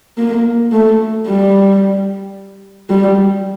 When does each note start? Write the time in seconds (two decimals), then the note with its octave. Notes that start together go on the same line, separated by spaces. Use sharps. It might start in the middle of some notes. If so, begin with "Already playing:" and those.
0.18 A#3
0.72 A3
1.27 G3
2.90 G3